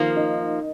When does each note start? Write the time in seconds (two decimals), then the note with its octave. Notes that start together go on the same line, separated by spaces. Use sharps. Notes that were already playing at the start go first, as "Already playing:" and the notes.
Already playing: D#3 F3 A#3
0.16 D#4